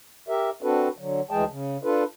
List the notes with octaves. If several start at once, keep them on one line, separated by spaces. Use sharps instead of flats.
G4 A#4 E5
C4 D4 F#4 A4 B4
D3 F#3
D2 E3 G#3 G#4 G5 A5
C#3
D4 F4 A4 B4